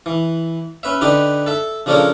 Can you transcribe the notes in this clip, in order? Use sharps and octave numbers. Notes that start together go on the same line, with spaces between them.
E3
C#4 B4 E5
D3 D#4 G4 B4
A4 E5
C#3 F3 D4 A4 A#4 C#5